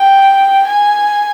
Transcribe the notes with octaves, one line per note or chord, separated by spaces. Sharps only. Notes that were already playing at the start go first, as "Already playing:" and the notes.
Already playing: G5
G#5